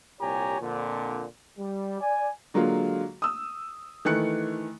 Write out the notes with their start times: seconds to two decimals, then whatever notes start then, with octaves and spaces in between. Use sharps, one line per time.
0.21 C2 A#2 G4 C#5 G#5 A#5
0.60 F2 A#2 D3
1.58 G3
2.01 D5 G#5
2.54 D3 F#3 G#3 A#3 F4
3.22 D#6 E6
4.05 D#3 E3 A3 F#6 C#7